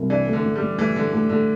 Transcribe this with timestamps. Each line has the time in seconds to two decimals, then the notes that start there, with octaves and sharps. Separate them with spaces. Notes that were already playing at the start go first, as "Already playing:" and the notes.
Already playing: C2
0.10 E3 D4
0.27 A3
0.33 D3
0.44 A1
0.55 G3
0.61 A1
0.78 E3 A3
0.96 A1 D3
1.13 A2 D3
1.29 A2 D3